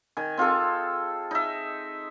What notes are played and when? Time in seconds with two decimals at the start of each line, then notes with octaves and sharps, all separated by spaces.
0.17 D#3 G#5
0.37 C4 F4 G#4 A4
1.31 D#4 E5